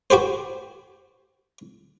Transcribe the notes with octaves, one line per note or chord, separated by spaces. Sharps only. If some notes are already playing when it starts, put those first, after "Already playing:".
F#4 G4 B4 C5